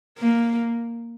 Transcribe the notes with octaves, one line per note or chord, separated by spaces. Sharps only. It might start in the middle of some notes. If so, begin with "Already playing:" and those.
A#3